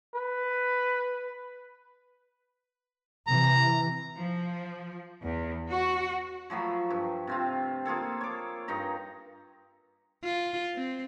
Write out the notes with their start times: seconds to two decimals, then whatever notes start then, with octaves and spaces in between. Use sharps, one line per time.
0.15 B4
3.27 C3 E3 A#5
4.18 F3
5.24 E2
5.70 F#4
6.50 F3 F#3 A3 B5
6.90 G2
7.27 C3 C4 F4
7.85 A#3 F4 G#4 A4
8.21 C#5 D6
8.68 G2 D#4 A#5
10.24 F4
10.75 C4